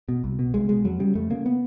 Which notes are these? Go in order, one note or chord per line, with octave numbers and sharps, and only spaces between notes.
B2
C2
B2
C2 G#3
B2 G#3
F2 F#3
C#3 G3
F2 A3
C#3 A#3
B3